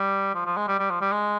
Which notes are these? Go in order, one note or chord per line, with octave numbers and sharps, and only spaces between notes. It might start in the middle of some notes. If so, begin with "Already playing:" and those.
Already playing: G3
F3
F3
G#3
G3
G3
F3
G3
G#3